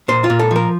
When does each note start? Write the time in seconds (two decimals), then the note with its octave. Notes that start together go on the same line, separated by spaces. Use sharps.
0.08 A#2 C5
0.24 F4
0.30 A#2
0.39 A4
0.51 F3 A#4